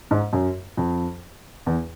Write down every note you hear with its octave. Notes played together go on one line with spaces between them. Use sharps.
G#2
F#2
F2
E2